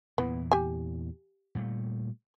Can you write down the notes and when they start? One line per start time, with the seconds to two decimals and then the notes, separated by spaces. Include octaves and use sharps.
0.18 E2 A#2 E3 B3
0.51 G4 G#5
1.55 A#2 G3 A3